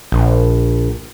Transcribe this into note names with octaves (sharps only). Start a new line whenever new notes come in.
A#1